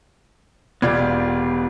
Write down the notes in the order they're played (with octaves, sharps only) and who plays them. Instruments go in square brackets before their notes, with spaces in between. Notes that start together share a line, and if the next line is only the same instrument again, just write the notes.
[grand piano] E1 D5 G#6 [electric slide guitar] B3 F4 G4